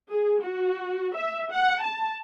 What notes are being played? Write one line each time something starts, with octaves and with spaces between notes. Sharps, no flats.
G#4
F#4
E5
F#5
A5